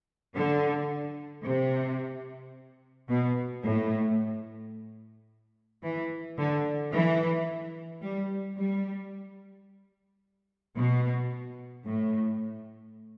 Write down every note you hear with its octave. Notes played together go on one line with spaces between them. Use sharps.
D3
C3
B2
A2
E3
D3
E3
G3
G3
B2
A2